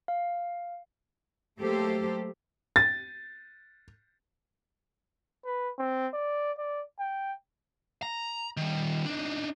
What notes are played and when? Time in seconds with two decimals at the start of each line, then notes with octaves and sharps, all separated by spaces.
0.08 F5
1.59 F#3 A3 A#3 G4 A4 C5
2.76 A6
5.45 B4
5.79 C4
6.14 D5
6.58 D5
6.99 G5
8.02 A#5
8.57 D#3 G3
9.06 D4 D#4